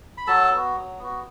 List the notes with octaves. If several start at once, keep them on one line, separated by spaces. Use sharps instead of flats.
B5
F#3 A4 A5
B3 F#4
F#3
B3 F#4